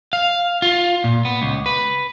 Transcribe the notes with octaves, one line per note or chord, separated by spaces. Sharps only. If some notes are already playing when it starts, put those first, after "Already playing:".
F5
F4
A#2
B3
C#2
B4